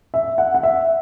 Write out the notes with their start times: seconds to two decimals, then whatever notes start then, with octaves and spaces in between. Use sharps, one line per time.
0.14 E5
0.38 F#5
0.54 F#5
0.63 E5